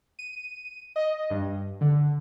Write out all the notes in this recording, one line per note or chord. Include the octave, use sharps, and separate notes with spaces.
D#7
D#5
G2
D3